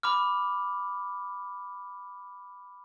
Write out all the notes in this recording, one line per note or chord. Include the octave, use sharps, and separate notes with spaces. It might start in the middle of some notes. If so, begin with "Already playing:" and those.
B5 D6 F6